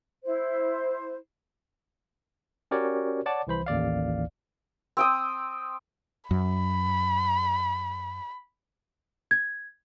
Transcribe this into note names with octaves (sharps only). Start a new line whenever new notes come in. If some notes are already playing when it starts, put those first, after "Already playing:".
E4 C5
C#4 F#4 G4 A#4 C#5 D5
C#5 D5 F#5 A5 D6
C2 E3 C5 B5
A1 D#2 D5 F5
C4 G5 D#6
F#2 B5
G#6